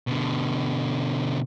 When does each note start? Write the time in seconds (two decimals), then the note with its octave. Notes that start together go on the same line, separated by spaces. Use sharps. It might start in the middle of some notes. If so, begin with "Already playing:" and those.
0.07 B2 D3